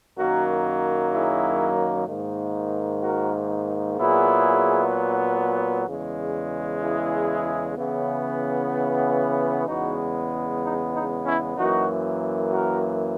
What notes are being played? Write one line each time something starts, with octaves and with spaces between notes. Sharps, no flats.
F#2 D#3 F#3 A#3 F#4 A#4
E4 G#4
G#2 D#3 A#3
F#4 A#4
A#2 F#3 B3 E4 G#4
E2 C#3 G#3
E4 G#4
C#3 E3 B3
E2 C#3 G#3 B3 D#4 F#4
D#4
D#4
C#4 E4
F#2 E3 A#3 D#4 F#4
F#4 A#4